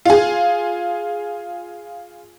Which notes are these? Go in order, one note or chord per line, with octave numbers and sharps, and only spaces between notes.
F4 G#4